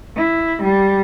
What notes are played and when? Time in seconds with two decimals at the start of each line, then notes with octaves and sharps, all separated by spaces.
0.16 E4
0.63 G3